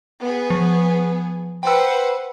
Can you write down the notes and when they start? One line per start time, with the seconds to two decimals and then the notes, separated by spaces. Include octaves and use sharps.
0.21 B3 G#4
0.50 F3
1.63 B4 C5 F#5 G5 E6